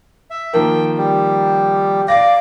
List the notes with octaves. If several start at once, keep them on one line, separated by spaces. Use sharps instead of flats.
E5
D#3 F3 A#3 G5
G3
D5 F5 A#6 D7